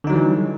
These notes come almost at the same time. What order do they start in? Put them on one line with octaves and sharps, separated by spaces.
D3 D#4 F#3 G3 E3